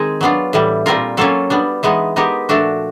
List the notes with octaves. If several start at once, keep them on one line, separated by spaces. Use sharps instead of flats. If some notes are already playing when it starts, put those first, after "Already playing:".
Already playing: D#3 G#3 C4 D#4 G#4
F#3 B3 D4 F4
A2 E3 G3
A#2 G3 C4 F4 A#4
F#3 A#3 C#4 F4 A4
G3 B3 D4
E3 G#3 B3 D#4
G#3 B3 D#4 G4 A#4
A#2 F3 A3 D4 F#4